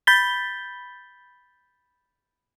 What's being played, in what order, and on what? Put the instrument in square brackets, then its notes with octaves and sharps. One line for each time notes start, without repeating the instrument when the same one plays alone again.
[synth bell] B5 G6 A6 B6 G7